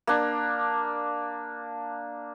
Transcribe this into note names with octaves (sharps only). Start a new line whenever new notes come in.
A#3 D4